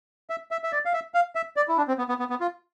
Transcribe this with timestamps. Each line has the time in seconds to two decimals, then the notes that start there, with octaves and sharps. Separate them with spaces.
0.30 E5
0.51 E5
0.64 E5
0.72 D5
0.85 F5
0.93 E5
1.14 F5
1.35 E5
1.56 D5
1.68 E4
1.77 D4
1.88 C4
1.98 B3
2.09 B3
2.19 B3
2.30 B3
2.41 F4